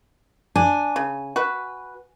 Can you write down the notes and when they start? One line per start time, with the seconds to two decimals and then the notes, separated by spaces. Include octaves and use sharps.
0.56 D4 G#5
0.96 C#3
1.36 F#4 B4